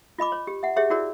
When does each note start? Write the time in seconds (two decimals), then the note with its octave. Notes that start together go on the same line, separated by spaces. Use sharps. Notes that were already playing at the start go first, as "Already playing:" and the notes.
0.18 F4 D#5 B5 D6
0.32 C#5
0.47 G4
0.63 E5 F#5
0.76 G4 G#4 C#5 E5
0.90 E4 F#4 G#4 A#4 C#5 D5